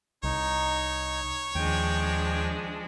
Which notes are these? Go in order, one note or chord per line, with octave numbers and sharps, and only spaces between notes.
C2 D#4 C#5
D#2 F3 G#3 D4 G5